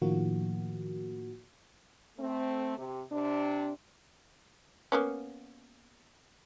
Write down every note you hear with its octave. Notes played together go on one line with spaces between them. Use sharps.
A2 D#3 F3 A#3 F#4
A3 C4
C3
C3 D4
A#3 B3 C#4